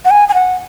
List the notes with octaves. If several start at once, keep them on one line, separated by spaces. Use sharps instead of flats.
F#5
G#5
G#5
F#5